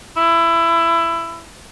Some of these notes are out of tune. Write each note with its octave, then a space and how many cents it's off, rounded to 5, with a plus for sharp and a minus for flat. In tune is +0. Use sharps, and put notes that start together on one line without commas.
E4 +20